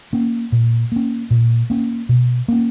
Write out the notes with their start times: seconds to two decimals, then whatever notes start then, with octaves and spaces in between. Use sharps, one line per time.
0.13 A#3 C#4
0.52 A#2
0.92 A#3 C#4
1.30 A#2
1.70 A#3 C#4
2.09 B2
2.48 A#3 C#4